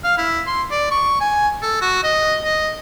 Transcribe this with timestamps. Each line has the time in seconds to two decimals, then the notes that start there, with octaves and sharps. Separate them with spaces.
0.04 F5
0.18 E4
0.47 C6
0.71 D5
0.91 C#6
1.21 G#5
1.62 A4
1.82 F#4
2.04 D#5
2.44 D#5